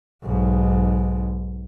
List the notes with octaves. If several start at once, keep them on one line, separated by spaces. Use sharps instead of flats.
B1 G#2